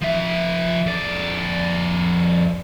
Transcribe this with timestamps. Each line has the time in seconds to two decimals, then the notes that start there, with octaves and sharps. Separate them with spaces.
0.02 F3 E5
0.86 F2 D5